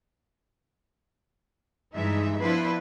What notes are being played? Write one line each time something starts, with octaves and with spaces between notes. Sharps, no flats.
G2 E3 G#3 D#4 E5
F3 B3 D4 E4 B4 C5